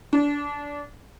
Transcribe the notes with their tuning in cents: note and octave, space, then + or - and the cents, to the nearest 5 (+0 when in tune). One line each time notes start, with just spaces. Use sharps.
D4 -20